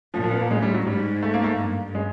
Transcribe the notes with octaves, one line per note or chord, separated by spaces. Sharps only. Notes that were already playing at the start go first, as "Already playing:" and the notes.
A#2 F3
F3
B3
A#3
A2 G#3
G3
F#3
G#2 G3
A3
A#3
A3
G2 A#3
G#3